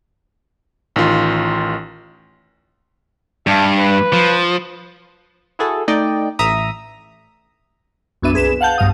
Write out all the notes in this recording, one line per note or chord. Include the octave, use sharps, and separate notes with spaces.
A1 D#3 F4 C6
G2 E5 F5 A5
B4
F3
E4 F#4 G#4 A4
A3 D#4 D5 D#5 G5
A1 E5 A#5 D#6
B1 F#2 B3 D4 E5 D#7
C2 G#4 B4 E7
F5 F#5 A5 G6
B1 G2 F5 D#6